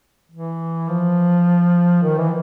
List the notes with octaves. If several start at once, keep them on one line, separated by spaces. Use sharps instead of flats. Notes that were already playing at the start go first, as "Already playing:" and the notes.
E3
F3
D#3
E3